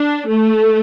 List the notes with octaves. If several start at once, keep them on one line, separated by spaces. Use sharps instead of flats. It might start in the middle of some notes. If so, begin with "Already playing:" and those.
Already playing: D4
A3